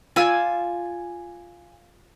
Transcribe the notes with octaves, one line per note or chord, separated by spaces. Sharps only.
F4 D5 G#5 E6